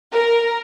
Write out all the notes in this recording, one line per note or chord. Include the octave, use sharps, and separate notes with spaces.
A#4